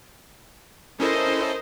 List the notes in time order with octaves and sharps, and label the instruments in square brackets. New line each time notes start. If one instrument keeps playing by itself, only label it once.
[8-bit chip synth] C#4 E4 A4 [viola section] A#4 C5 D#5